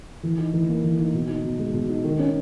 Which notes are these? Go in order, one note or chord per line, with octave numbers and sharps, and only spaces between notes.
E3
D#4
E3
A#3
E3
D#4
B2
D#4
B2
G#3
B2
D#4
D#3
C#4